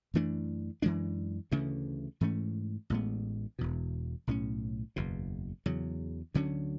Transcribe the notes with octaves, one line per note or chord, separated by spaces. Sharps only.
F#2 E3 A3 D4
F#2 E3 G#3 D4
D2 C#3 E3 A3
G#2 E3 A3 C#4
A1 A2 G#3 B3
E1 E2 B2
B1 A2 F#3 C#4
F#1 E2 B2
E2 C#3 F#3
D2 D3 F#3 C#4